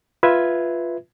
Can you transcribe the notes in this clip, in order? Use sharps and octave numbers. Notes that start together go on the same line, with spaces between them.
F4 B4 E5 G#6